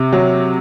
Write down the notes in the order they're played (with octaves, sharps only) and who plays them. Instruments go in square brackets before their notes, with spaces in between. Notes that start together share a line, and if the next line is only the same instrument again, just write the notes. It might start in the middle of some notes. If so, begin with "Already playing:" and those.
Already playing: [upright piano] C3
F#3